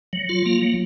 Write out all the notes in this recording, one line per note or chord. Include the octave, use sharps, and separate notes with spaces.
F#3
F4
A#3
F#3